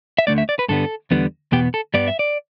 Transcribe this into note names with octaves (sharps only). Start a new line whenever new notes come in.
E5
D2 D3 A3 D5
E5
D5
B4
G2 D3 G3 B3 A4
E2 D3 G3 B3
E2 B2 B3 G4
A4
G2 G3 B3 D5
E5
D5